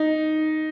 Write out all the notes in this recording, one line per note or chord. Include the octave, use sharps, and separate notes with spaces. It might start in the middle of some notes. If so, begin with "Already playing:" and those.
Already playing: D#4